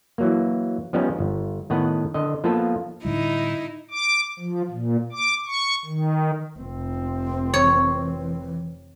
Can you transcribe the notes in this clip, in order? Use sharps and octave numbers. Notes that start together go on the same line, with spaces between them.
E3 F#3 A#3
F3 G3 B3 C#4 D#4
G1
A2 D#3 B3 B4 F#5
D3 D#5
F3 A#3 B3 F4 A4 B4
A2 D3 G3 D#4 E4
D6
F3
A#2
D6
C#6
D#3
F1 C4
E3 C#5